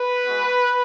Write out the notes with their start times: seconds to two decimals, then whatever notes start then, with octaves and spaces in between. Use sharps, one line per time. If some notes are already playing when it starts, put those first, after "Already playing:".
Already playing: B4
0.24 G#3 B3 F#4